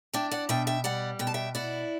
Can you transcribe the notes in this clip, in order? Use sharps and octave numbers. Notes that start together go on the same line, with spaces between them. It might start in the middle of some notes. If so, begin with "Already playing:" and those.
D4 E5 G5
D5 F#5
B2 E5 G5
E5 G5
G3 D5 F#5
B2 G5
A5
E5 G5
E4 D5 F#5